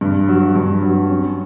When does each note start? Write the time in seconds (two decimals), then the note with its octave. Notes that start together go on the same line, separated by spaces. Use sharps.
0.01 G2
0.28 F#3
0.55 G2
0.83 F#3
1.10 C#4